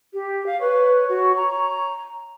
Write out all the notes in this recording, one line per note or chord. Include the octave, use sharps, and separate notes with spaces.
G4
F5
B4 C#5
F#4
A#5